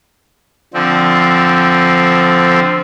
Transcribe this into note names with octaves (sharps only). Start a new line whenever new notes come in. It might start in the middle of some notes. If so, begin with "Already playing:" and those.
D3 F3 C4